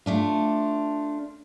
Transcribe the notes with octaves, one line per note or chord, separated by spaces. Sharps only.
A3 D4 F4